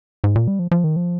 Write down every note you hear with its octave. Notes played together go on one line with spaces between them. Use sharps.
G#2
A#2
G3
F3
F3
D#3
F3